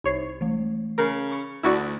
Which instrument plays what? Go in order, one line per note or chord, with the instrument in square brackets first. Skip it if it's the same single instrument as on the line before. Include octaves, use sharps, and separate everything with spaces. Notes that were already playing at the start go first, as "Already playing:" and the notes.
[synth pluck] C2 C#5 C7 [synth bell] D#4 C5
[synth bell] E3 A3
[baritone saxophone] C#3 [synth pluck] A#4
[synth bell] B5 C#6 C#7
[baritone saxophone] D2 [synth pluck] E4 F#4 D5